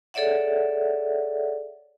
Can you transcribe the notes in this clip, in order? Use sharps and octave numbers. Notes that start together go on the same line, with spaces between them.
G#4 A4 C#5 D5 E5 F#5